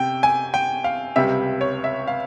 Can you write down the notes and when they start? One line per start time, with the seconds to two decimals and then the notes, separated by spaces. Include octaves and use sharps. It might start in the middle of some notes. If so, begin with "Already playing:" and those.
Already playing: C3 G5
0.23 G#5
0.54 G5
0.84 F5
1.16 C#2 C3 G3 E5
1.61 C#5
1.84 E5
2.07 F5